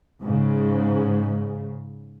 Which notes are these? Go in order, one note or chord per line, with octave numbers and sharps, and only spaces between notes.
G#2 C#3